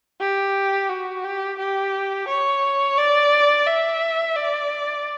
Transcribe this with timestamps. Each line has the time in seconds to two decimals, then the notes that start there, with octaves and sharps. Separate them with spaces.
0.20 G4
0.89 F#4
1.24 G4
1.58 G4
2.28 C#5
2.97 D5
3.67 E5
4.36 D5